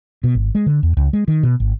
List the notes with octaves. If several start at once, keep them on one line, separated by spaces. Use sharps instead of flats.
B2
G#1
G#3
D3
E2
C#2
G#3
D#3
B2
G#1